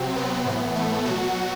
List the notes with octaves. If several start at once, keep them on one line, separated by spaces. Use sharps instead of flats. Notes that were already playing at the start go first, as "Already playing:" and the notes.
Already playing: C3 F#3 C4
B3
A2 E3
A3
B2 F#3 F#4